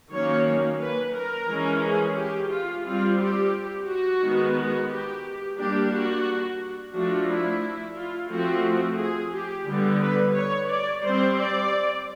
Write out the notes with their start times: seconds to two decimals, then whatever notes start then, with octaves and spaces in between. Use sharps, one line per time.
0.11 D#3 F#3 A#3 C#4 C#5
0.80 B4
1.14 A#4
1.48 E3 G#3 C#4
1.83 G#4
2.16 G4
2.50 F4
2.84 G3 C4 F4
3.18 G4
3.87 F#4
4.21 D#3 G#3 B3
4.56 F#4
4.89 G4
5.57 G3 A#3 D4 G4
5.92 F#4
6.93 F3 A3 D4 F#4
7.28 E4
7.96 F4
8.30 F3 A3 C4 F#4
8.98 G#4
9.33 G4
9.67 D3 G3 B3
10.00 B4
10.35 C#5
10.69 D5
11.03 G3 C4 C5
11.37 D5